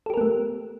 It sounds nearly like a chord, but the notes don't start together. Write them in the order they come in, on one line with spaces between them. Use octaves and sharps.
A4 G4 A#4 B3 A3